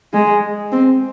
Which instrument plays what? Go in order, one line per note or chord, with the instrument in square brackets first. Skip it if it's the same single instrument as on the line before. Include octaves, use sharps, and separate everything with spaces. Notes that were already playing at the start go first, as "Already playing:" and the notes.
[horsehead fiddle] G#3
C4